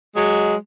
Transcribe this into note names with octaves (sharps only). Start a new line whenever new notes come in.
F#3 G#3